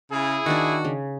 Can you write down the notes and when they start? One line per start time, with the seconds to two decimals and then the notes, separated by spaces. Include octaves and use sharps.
0.11 C#3 E4 G#4
0.46 D#3 D4 F#4
0.85 C#3